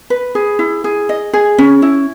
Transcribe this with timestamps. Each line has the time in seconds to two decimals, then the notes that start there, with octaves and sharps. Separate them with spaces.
0.10 B4
0.35 G#4
0.59 E4
0.84 G#4
1.09 D#5
1.33 G#4
1.58 C#4
1.82 E4